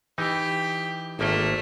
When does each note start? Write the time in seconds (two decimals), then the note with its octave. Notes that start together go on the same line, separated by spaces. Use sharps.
0.18 E3 D#4 G4
1.19 G#1 A3 A#3 G5